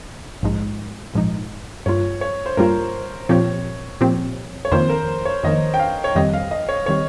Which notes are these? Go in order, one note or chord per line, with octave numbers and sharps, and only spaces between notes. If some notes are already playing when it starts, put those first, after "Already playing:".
A#1 G#2 F3 G#3 D#4
A#1 G#2 F3 G#3 D#4
G2 G3 A#3 F4 C#5
C#5
C5
G2 G3 A#3 F4 A#4
A#2 F3 C4 G4 C#5
A#2 F3 C4 G4
C#5
F2 D#3 A#3 C5
A#4
C#5
F2 D#3 A#3 D#5
G5
F5
C#5
F2 D#3 G3 C4 G4 D#5
F5
D#5
C#5
D#3 G3 C4 G4 C#5